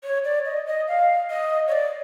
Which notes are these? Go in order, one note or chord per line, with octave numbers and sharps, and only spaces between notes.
C#5
D5
D#5
D#5
F5
D#5
C#5
D5